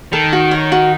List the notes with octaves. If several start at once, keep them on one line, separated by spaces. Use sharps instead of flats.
D#3 A4
F#4
C#5
F#4